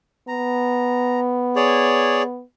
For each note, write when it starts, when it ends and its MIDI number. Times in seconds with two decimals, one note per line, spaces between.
0.28 2.42 59
0.28 1.20 82
1.56 2.22 68
1.56 2.22 73
1.56 2.22 74